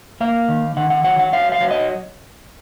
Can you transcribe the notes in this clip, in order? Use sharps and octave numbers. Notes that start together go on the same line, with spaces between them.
A#3 F5
D#3
D#3 F#5
F#5
F#3 F#5
F#5
F#3 F5
F5
F#3
D#5